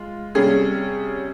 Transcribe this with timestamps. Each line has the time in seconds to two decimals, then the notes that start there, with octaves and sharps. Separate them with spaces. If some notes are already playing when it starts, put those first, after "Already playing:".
Already playing: G#3 F4
0.35 C3 G3 C#4 G#4